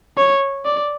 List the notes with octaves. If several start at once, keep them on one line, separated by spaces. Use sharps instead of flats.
C#5
D5